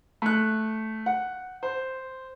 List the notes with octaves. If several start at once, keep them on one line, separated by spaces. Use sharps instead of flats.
A3 F#6
F#5
C5